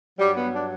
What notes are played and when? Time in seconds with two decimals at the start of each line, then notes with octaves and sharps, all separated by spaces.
0.19 G2 F#3 G3
0.37 B3
0.54 D4